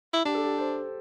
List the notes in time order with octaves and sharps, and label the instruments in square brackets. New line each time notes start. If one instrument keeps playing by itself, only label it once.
[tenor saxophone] E4
[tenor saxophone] D4 [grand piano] G4
[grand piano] A4
G4
C5